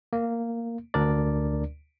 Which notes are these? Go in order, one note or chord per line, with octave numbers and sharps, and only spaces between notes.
A#3
D2 D4 A#4 D5